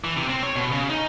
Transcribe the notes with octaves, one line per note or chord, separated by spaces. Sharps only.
E3
C3
C4
C#5
B2
C#3
D#4